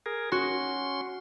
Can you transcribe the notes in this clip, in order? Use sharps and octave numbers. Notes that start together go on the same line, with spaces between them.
G#4 A#4
C#4 F#4 C6